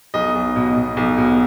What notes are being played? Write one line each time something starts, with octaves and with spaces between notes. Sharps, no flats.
B1 D#5
B1
B2
B2
B1
B2